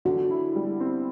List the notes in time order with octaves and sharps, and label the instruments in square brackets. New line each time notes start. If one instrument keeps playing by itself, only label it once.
[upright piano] D3 [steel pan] F#4
[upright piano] E4
G3
C4